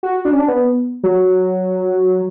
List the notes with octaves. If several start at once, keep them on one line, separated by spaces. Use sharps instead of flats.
F#4
D4
C#4
D4
B3
F#3